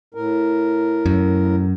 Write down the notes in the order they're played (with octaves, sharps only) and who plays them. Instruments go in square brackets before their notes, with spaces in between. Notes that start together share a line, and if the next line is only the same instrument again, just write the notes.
[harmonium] A2 A#4
[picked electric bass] F#2